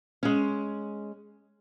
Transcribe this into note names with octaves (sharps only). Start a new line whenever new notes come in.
G#3 C#4